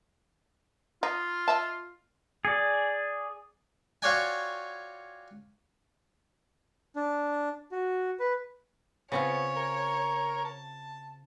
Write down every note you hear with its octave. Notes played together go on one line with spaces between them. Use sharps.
D#4 F4
D#5 E5 A5
G#4 D5
F4 F#4 C#5 D5 G5 G#5
D4
F#4
B4
C#3 B3 C4 F4 C#5
A#4
A5